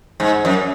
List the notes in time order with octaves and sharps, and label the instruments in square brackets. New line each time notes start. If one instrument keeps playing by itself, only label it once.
[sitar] G#2
F#2